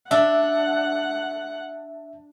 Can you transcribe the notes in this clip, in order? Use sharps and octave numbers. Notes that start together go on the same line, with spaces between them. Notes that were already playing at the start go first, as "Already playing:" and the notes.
D4 E5 F#5